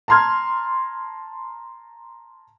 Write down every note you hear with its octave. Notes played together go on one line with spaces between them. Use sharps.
A5 A#5 C6 F6 G#6